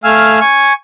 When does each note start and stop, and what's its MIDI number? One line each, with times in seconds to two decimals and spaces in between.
0.04 0.39 57
0.04 0.39 77
0.04 0.39 80
0.04 0.39 88
0.04 0.39 89
0.41 0.73 80
0.41 0.73 85